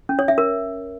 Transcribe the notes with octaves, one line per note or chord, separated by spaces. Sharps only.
C#4
C#5
E5
A#4